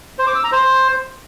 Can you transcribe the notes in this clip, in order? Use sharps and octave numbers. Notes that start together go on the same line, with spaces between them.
C5
D6
E6
A#5
C5